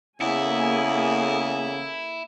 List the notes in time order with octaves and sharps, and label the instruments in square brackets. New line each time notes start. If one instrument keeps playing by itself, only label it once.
[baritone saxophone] E2 [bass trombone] C#3 [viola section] A#3 A4 G#5 [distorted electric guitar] E4